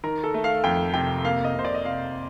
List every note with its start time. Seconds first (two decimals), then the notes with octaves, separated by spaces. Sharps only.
0.04 D#3 A#4
0.24 A4
0.34 A3
0.44 F5
0.64 F2 G5
0.94 C3 G5
1.25 A#3 F5
1.44 D#5
1.55 C3 C5
1.65 D5
1.74 D#5
1.85 C3 F5